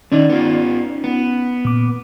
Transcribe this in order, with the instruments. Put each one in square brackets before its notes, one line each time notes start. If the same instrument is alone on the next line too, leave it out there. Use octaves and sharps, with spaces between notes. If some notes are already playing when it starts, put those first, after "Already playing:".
[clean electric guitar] D#3 D5 [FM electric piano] C#4 D#4
[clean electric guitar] B3 F4
B3
[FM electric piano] A#2 D6